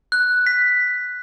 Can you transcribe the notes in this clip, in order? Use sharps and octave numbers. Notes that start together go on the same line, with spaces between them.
F#6
B6